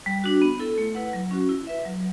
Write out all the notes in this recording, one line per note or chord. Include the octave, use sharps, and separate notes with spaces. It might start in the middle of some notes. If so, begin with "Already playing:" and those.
G3
D4 F#4
B3
E4 A4
A3
E4 B4 F#5
F#3
C#4 F#4
E4
B4 E5
F#3